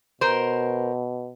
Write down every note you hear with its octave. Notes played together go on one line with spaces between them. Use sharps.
B2 A#4 C5